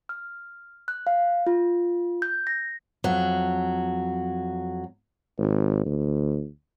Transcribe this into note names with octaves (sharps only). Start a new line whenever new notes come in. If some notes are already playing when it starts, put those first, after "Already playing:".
F6
F#6
F5
F4
G6
A#6
F2 F#3
G#1
D2